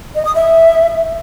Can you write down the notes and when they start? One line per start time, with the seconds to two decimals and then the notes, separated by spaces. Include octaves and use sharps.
0.15 D#5
0.25 D#6
0.35 E5